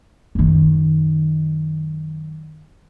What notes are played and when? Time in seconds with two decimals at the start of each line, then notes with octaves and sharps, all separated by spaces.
0.35 F#2 D#3